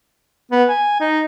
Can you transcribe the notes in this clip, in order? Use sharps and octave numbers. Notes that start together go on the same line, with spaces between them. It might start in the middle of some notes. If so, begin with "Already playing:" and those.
B3
G#5
D#4